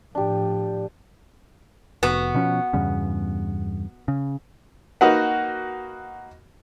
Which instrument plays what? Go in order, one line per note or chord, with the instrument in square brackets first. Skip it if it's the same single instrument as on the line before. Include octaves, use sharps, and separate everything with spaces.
[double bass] A2 F3 [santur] D4 G4
[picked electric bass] F1 [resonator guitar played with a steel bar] B3 F#4
[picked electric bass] B2 F3 C#4
E2 G2 C#3
C#3
[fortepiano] A#3 D#4 F#4 B4 F#5